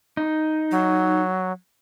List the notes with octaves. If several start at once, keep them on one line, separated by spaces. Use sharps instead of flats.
D#4
F#3